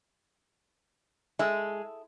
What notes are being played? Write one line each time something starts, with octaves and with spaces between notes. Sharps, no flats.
G#3 E4 G#4 A4